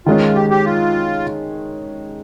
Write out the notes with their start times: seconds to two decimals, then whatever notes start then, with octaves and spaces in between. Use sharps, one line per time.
0.06 D#3 G#3 C#4 F4
0.35 G4
0.50 G4
0.65 F4